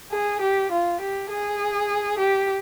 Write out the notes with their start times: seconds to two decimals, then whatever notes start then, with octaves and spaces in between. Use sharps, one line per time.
0.12 G#4
0.41 G4
0.72 F4
1.01 G4
1.30 G#4
2.19 G4